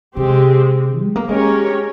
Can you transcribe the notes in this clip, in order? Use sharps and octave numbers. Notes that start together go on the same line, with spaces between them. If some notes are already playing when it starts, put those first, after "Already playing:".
C3 G#3 C4 G4
G#3
A#3
G#3 C#4 G4 A#4 C#5